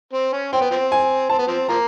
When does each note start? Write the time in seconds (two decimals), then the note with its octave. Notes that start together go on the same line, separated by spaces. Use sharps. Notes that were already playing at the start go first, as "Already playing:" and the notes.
0.13 C4
0.33 C#4
0.52 C4 G5
0.61 B3
0.71 F3 C4
0.92 G#5
1.30 C4 A5
1.39 B3
1.48 F3 C4
1.68 F3 A#3 A#5